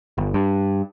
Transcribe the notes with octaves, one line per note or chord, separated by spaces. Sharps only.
G1
G2